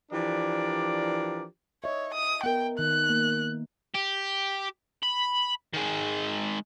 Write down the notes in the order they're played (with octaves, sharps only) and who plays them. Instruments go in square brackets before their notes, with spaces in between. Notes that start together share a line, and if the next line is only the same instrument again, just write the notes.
[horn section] E3 F3 D4 G4 A#4 D5
[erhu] C#5 [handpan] D#5 E5
[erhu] D#6
[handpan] B3 A#4 [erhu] G5
[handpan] D#3 [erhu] F#6
[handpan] A#3
[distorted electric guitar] G4
B5
D#3 G#3